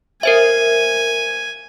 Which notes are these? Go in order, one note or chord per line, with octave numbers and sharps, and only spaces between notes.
A#4 C5 E5 G#5